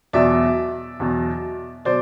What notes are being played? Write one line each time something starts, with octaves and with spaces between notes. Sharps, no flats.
E2 B2 F#3 D5 E5
E2 B2 F#3
B2 F#3 C5 D5